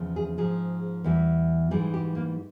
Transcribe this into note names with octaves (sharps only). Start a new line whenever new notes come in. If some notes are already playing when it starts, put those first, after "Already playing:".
Already playing: E2 C#3 F3
G#4
G#2 F3 G#4
E2 E3 G3
G#2 E3 G3 G#4
G4
A#3